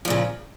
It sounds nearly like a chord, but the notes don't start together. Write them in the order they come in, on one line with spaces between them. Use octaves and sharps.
F3 A#2 C#3